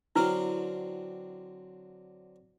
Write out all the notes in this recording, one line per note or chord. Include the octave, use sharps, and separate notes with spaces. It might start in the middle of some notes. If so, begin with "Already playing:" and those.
D3 F#3 C4 E4 B4